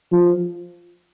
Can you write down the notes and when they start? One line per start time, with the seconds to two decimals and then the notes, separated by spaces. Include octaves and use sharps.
0.12 F3